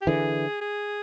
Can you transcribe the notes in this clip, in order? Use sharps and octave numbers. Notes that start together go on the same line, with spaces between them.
G4
D3 E3 G#4
G#4